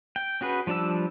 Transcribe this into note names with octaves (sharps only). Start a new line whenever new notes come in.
G5
C#4 F#4 G#4 B4
F3 G3 D4 A5 E6